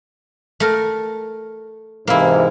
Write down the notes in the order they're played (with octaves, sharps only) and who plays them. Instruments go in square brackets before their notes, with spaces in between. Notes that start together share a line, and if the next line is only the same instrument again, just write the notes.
[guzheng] A3 A#4
[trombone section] G#2 C3 E3 [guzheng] A#3 E4